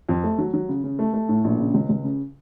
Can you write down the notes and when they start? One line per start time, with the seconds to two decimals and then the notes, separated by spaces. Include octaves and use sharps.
0.09 F2
0.24 A3
0.38 F#3
0.53 F#3
0.69 C#3
0.84 C#3
0.99 A3
1.14 A3
1.29 A2
1.44 A#1
1.59 C#3
1.74 C#2
1.89 C#2
2.04 C#3